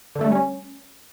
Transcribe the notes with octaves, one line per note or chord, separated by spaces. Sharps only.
D3
A3
G3
C#4